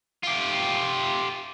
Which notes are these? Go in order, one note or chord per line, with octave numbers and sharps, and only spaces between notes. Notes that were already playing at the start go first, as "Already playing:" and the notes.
F4 G4